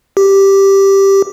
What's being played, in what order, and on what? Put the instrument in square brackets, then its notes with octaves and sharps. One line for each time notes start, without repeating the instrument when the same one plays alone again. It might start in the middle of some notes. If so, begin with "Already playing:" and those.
[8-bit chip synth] G4